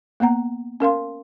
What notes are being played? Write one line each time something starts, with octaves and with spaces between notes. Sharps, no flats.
A#3 B3 F#5 A#5
C#4 A#4 F5 C6